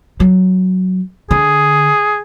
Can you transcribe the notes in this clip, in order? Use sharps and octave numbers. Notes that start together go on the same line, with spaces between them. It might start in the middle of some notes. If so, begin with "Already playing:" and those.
F#3
D3 G#4